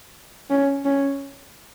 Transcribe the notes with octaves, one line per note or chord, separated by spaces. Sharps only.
C#4
C#4